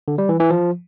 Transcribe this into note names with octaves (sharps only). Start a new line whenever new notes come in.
D3
G3
E3
E3
F3